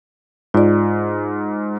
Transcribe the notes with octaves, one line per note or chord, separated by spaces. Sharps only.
G#2 F4 D5